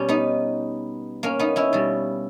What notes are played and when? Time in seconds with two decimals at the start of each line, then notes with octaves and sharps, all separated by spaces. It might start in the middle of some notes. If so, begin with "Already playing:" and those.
Already playing: B2 G3 C#4 G4
0.08 B3 D#4
1.23 A#3 C#4
1.39 B3 D#4
1.56 C#4 E4
1.73 B2 G3